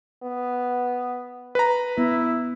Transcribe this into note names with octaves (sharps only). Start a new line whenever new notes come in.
B3
B4 A#5
B3 E4